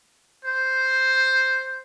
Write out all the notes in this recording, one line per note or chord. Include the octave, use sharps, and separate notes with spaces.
C5